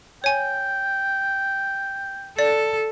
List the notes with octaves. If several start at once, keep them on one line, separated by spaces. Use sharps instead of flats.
C#5 G5 G#5
A4 D5